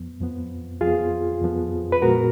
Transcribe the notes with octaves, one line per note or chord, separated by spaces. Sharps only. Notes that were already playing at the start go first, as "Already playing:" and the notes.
Already playing: F2 F3 B3
F2 F3 B3
F2 F3 B3 F4 G#4
F2 F3 B3
B4
A#2 G#3 B3 F#4 A#4